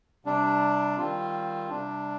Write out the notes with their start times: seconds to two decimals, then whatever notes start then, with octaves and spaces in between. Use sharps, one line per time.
0.25 C3 G3 D4
0.98 D#3 G3 C4 F4
1.69 C3 G3 D4